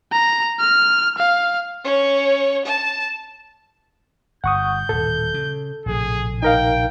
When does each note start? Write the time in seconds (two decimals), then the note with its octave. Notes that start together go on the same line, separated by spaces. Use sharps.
0.13 A#5
0.60 F6
1.18 F5
1.84 C#4 C#5
2.65 A5
4.44 G1 F#5 C#6 D#6 G6
4.89 D#1 A2 A4
5.34 C#3
5.86 A#1 A2 C3 G#4
6.43 D#4 A#4 F5 G5